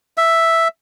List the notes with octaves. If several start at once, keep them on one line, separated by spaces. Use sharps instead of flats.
E5